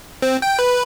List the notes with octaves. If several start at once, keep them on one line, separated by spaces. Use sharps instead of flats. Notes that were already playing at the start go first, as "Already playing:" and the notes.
C4
G5
B4